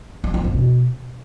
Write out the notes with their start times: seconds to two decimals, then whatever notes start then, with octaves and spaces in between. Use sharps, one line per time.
0.24 F#3
0.34 F3
0.44 F2
0.54 B2